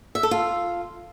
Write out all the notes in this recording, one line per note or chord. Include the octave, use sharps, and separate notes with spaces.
E5
A4
F4